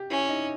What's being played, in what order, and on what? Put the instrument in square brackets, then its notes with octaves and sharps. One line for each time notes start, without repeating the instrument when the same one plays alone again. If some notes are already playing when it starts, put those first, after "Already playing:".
Already playing: [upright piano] G4
[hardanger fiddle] C#4 [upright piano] E4
[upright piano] D#4